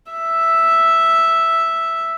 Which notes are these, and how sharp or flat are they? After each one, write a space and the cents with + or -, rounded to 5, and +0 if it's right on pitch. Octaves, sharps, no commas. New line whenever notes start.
E5 +0